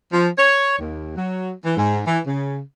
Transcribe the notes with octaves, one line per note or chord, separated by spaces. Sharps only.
F3
C#5
D#2
F#3
E3
G#2
E3
C#3